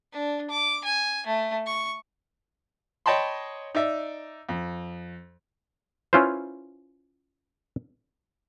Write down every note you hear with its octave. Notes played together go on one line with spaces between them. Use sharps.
D4
D6
G#5
A3
C#6
C#5 D#5 G5 A5 B5 C6
D#4 D5 E5
F2
C#4 E4 F4 B4 C5